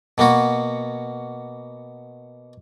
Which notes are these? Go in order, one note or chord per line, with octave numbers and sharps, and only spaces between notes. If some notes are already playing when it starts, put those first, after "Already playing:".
B2 A#3 B3 F#4